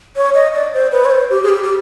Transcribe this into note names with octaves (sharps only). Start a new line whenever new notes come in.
C#5
D#5
D5
C5
B4
C#5
C5
G4
G#4
G4
G4